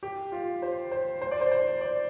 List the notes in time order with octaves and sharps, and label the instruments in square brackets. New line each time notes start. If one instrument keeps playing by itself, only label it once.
[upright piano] G4
F4
C5
C5
C5
D5
C5
C5
D5